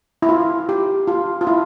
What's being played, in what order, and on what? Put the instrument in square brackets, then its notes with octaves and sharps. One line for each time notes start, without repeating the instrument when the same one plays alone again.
[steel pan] E4
F4
G4
F4
F4
E4